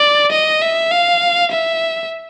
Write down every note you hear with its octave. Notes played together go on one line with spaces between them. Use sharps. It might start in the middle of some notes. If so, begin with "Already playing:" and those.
Already playing: D5
D#5
E5
F5
E5